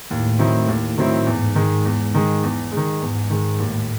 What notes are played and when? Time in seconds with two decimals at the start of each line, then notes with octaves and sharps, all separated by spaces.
0.10 D#2 A2
0.39 D#3 F#3 C4 E4
0.68 D#2
0.98 D#3 F#3 C4 E4
1.26 E2 G#2
1.55 D#3 G#3
1.85 E2
2.14 D#3 G#3
2.43 E2
2.71 G#3
2.77 D#3
3.01 E2 G#2
3.30 D#3 G#3
3.59 D#2 A2